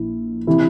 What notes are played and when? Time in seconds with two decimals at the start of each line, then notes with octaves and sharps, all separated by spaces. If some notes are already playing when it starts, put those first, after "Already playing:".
Already playing: A#1 A#2 E4
0.47 C3 E3 E4